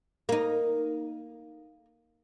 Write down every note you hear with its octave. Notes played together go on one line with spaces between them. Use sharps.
A#3 D#4